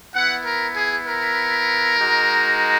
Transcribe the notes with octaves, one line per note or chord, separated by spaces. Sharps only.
B3 E4 F#5
A#4
G#4
A#4
G#3 D#4 F#4